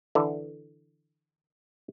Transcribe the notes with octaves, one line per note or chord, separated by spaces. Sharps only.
D3 E3